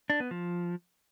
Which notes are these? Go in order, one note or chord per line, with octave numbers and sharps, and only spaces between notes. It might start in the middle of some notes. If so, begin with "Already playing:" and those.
D4
B3
F3